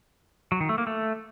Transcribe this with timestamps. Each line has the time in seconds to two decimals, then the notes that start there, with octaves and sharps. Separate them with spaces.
0.52 F#3
0.60 D#3
0.69 A3
0.78 A#3
0.87 A3